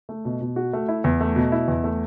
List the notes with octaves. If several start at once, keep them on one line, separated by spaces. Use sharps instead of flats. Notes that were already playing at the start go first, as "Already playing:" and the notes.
A3
B2
B2
F#4
A3
E4
E2
A3
B2
E4
E2
A3